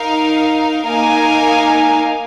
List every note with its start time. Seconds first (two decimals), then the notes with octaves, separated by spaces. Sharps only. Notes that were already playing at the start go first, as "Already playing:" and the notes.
Already playing: D#4 A#4 F5
0.84 A#3 D#4 A#4 F5 G#5